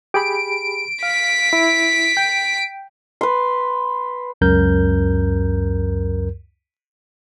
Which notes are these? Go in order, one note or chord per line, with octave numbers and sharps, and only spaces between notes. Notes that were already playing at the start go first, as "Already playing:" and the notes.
G4 G#4 B5 D7
F5 B6
E4
G5
B4 C6
C#2 F#2 A#4 G6